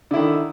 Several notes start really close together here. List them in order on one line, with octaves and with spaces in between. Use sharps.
D3 E4 D#3